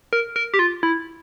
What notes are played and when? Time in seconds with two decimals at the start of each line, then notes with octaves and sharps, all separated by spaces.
0.13 A#4
0.36 A#4
0.54 G4
0.59 F4
0.83 E4